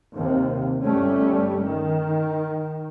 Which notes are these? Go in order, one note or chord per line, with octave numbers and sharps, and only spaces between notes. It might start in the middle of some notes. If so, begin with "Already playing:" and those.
D#2 C3
G1 G3 A3 C#4
D#3